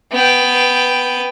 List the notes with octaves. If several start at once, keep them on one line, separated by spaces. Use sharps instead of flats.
B3 G5